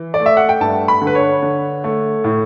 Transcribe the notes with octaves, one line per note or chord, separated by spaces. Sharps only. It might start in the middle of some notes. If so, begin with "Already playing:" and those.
Already playing: E3
D5
A3
E5
F#5
G5
G2 A5
B5
D3
B4
C#5
D3
A3
A2